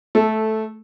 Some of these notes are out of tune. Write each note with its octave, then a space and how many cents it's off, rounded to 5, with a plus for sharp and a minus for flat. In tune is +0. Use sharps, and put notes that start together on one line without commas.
A3 -10 A4 +0